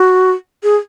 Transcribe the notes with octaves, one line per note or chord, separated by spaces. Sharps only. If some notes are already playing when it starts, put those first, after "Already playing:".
Already playing: F#4
G#4